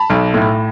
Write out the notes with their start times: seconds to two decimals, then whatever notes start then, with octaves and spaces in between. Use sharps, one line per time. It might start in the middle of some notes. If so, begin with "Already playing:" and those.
Already playing: A5 B5
0.10 B1
0.34 A2